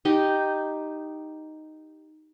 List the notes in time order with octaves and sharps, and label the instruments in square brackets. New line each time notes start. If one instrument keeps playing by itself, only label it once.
[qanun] D#4 G4 D#5